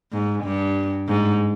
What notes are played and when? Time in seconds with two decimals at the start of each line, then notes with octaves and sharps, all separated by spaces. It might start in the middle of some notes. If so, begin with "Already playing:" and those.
0.13 G#2
0.44 G2
1.08 G#2